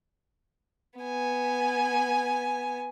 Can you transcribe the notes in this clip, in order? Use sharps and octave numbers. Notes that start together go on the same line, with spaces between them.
B3 G#5